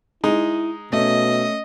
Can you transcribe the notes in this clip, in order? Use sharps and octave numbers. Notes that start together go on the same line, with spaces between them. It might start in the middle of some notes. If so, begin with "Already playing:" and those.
G#3 D#4 E4
B2 A3 C#4 D#5